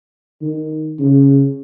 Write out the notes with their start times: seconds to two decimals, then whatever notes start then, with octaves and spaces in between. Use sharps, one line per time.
0.42 D#3
0.99 C#3